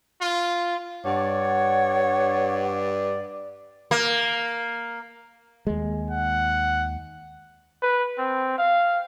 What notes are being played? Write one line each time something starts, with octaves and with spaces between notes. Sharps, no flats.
F4
G2 C#5 D5 F#5
A#3
D#2 G#3
F#5
B4
C4
F5